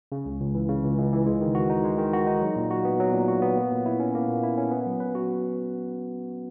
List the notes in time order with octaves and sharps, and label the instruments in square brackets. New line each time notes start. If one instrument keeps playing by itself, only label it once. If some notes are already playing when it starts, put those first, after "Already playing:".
[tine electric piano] C#3
C#2
C#2
E3
C#3
C#2
C#2
E3
G#3
D#3
F#4
D#4
G#3
D#3
F#4
D#4
F#3
A#2
F#4
B3
F#3
A#2
F#4
B3
A#3
A#2
E4
C#4
A#3
A#2
E4
C#4
B3
F#3
B4
F#4